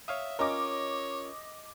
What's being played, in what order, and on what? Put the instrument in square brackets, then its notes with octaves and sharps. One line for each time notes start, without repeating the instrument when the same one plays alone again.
[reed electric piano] C#5 F5 D#6 [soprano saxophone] E5
[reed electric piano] C#4 F4 A#4 [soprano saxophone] C#5 [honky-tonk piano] D#5 D6